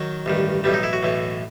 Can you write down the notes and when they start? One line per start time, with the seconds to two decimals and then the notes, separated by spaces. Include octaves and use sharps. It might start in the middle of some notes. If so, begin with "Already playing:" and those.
Already playing: D#3 F#3
0.26 A1 G2 D#3
0.64 B1 A2 E3 G3
0.74 D#4
0.83 E4
0.93 F#4
1.03 B1 A2 E3